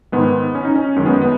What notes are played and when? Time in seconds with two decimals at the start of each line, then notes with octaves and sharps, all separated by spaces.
0.12 G#2 D#3 G#3 B3
0.55 C#4
0.65 D#4
0.76 C#4
0.96 F#2 D#3 G#3 C#4
1.06 B3
1.22 B3